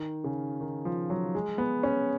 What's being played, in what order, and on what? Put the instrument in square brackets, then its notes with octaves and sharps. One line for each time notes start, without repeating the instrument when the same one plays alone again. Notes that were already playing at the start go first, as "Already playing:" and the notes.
Already playing: [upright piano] D#3
C#3
D#3
F3
F#3
G#3
B3
C#4